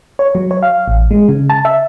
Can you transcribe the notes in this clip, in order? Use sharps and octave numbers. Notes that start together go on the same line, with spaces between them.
C#5
F#3
C#5
F5
A1
G#3
C#3
A5
E5